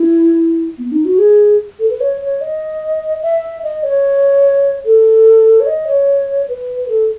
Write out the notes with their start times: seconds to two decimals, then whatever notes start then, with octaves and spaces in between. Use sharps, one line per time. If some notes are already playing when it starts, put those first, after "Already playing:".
Already playing: E4
0.78 B3
0.92 D#4
1.05 F#4
1.19 G#4
1.79 A4
1.90 B4
2.01 C#5
2.21 C#5
2.41 D#5
3.22 E5
3.63 D#5
3.83 C#5
4.85 A4
5.60 C#5
5.67 D#5
5.87 C#5
6.49 B4
6.89 A4